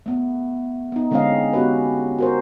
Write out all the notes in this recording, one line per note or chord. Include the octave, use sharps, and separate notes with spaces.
A3 B3
B3 D#4
D3 G#3 C4 C#4 D#5 F5
B3 C#4 F#4 G4 B4
F#4 A#4 C5